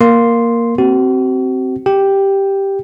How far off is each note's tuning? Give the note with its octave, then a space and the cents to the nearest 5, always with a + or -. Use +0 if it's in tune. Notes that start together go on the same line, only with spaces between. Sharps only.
A#3 +0 C6 +0
C4 +0 F#4 +40
G4 +0 G5 +0